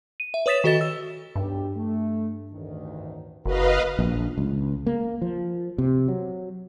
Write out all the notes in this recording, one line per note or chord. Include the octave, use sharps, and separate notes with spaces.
D#7
E5
B4 C#5 D#6 A6 B6 E7
D#3 F#4 A4 D#5 A6 E7
E6
B1 G2 G4
A3
A1 D2 D#3
F#1 F#4 A#4 B4 D#5 F5
A#1
C#2
A#3
F3
C3
F#3